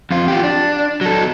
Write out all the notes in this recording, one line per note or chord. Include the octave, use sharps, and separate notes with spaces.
F2 F4
F4 G4
D4
F#3 A4